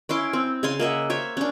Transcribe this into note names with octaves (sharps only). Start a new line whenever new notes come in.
C#4 E4 C6 D6
C4
C#3 F5 G#5 C6
A#3 D#5 E5 F#5
C5 C#5 E5
C#4 D4